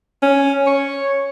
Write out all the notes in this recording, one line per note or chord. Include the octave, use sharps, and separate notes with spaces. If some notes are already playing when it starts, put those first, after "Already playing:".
C#4
C#5